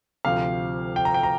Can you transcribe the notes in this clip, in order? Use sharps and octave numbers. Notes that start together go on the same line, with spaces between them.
D2 C3 F3 F5
G5
A#5
G5
A#5